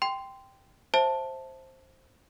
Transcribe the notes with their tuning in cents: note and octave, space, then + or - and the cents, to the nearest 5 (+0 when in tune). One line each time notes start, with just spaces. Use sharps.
G5 +0 C6 -15
C5 +10 E5 +0 A5 +0